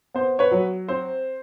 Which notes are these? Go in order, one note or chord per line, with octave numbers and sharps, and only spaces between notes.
B3 C5
B4 C#5
F#3
C4 C5